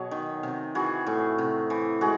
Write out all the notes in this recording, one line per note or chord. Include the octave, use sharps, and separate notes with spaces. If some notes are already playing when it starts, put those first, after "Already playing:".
Already playing: B2 F#3 G#4
D#3
C3
E3 F#4 G#4
A2
C3
E3
G#3 F#4 G#4